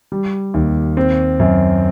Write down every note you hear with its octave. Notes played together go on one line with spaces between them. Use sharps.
G3
D#2
C4
F#2